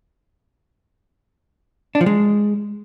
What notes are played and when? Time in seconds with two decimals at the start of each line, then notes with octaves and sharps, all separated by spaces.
1.95 D4
2.01 F3
2.06 G#3